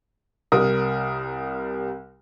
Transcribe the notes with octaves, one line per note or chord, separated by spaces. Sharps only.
C2 G3 A#4 D#6